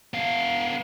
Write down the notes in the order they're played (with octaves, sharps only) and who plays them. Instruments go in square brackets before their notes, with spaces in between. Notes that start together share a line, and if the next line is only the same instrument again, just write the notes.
[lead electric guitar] B3 F5